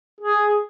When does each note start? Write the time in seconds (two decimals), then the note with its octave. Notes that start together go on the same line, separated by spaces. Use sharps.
0.21 G#4